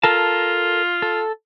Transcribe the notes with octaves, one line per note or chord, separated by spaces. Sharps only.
F4 A4 A#4 A5
A4